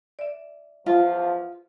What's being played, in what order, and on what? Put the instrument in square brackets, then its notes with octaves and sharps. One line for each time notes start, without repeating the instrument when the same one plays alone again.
[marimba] D5 E5
[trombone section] E2 F3 [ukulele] F4